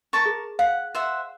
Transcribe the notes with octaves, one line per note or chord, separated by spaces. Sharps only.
A#4 A5 C#6
G#4
F5 F#5
C5 E5 F#5